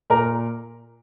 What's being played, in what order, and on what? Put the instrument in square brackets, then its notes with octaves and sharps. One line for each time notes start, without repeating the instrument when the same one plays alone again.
[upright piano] A#2 A#4 A#5